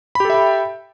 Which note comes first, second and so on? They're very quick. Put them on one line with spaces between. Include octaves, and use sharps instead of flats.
B5 G4 A4 E5 G5